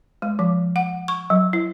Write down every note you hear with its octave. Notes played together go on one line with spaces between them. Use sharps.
G#3
F3
F#5
C#6
F#3
E4